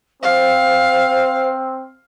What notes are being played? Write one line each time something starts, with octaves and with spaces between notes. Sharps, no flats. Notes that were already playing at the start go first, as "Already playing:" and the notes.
C4 C5 F5